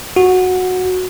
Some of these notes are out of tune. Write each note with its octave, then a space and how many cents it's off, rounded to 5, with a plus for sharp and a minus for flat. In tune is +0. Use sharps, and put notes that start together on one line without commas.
F#4 -10